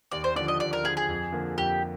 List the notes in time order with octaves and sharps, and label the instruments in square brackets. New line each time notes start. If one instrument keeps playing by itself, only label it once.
[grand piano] D#2 [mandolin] D5
[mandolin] C5
[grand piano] D3 F3 [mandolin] D5
[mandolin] D#5
[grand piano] D#2 [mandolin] D5
[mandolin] A#4
[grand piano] D3 F3 [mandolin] G#4
[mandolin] G#4
[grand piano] F2
D3 F3 A#3
[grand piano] F2 [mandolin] G4